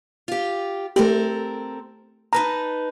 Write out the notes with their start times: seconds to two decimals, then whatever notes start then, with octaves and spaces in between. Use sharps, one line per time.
0.28 F4 G4
0.96 A3 C4 G4 A4 A#4
2.33 D#4 B4 A5 A#5